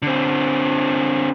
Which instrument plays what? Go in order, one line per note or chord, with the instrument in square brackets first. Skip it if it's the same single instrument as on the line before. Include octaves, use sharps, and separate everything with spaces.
[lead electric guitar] D3 C4